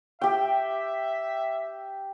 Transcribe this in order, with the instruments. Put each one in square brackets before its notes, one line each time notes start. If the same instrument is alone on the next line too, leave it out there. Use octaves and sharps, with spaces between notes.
[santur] G4 G5 [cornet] E5